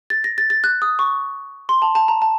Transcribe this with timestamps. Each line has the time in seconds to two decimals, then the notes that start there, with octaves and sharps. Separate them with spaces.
0.10 A6
0.24 A#6
0.38 A6
0.50 A6
0.64 F#6
0.82 D#6
0.99 C#6
1.69 C6
1.82 A5
1.95 A5
2.08 A#5
2.22 A5